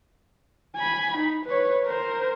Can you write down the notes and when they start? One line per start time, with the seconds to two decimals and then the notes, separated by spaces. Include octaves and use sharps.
0.77 G#5 B5
1.17 D#4
1.46 B4 C#5
1.86 A#4 C5